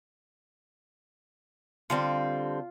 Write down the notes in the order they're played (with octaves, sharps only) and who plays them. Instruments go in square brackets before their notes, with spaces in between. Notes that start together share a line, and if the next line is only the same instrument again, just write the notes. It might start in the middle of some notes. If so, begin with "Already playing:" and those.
[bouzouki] D3 G3 C4 [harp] F4